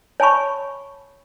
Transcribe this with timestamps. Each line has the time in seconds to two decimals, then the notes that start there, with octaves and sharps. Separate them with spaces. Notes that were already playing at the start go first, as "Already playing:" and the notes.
0.20 C#5 G#5 A5 B5 C#6